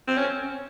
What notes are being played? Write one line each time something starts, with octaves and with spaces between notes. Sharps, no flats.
C4
C#4